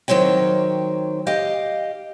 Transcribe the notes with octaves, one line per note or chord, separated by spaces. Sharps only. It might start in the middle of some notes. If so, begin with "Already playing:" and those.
D#3 F#3 C4 C#5 G5
G4 D#5 F5